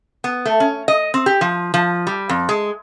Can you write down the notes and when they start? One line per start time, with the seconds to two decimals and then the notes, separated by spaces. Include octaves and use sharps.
0.24 B3
0.45 A3
0.60 C#4
0.88 D#5
1.14 C4
1.26 G4
1.41 F3
1.74 F3
2.07 G3
2.29 F2
2.49 G#3